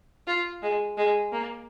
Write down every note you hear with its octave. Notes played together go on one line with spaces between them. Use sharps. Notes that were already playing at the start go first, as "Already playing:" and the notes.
F4
G#3
G#3
A#3